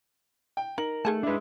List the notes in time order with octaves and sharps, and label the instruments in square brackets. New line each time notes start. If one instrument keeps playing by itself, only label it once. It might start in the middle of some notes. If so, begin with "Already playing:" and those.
[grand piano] G5
[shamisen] D#4 [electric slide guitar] A#4 [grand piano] F#7
[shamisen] D#3 G#4 A5 [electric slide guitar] A3
[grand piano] G#3 E4 [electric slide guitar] D4 B4